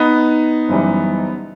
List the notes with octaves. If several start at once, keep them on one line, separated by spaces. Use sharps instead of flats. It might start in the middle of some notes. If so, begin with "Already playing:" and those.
Already playing: B3 D#4
F#1 F#2 E3 G3